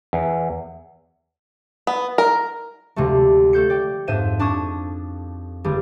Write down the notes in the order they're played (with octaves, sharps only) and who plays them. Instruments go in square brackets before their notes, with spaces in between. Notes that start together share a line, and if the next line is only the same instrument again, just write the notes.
[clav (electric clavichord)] E2
[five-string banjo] B3
A#4
[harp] D2 C3 F3 G#3 A3
A3 A4 G6 C#7
D5 G5
F2 G#2 C5 E5 D#7 E7
D4 A5 C#6 D#6 G#6
G1 G3 G#3 G#4